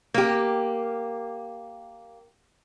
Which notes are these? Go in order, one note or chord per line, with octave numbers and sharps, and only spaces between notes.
A#3 G4